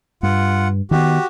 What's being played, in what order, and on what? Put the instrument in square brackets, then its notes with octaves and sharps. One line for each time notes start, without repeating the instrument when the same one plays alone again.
[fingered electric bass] G2 [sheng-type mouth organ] F4 F#5
[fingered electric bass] D#3 B3 [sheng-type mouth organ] F#4 G4